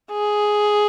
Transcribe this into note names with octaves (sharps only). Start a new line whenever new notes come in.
G#4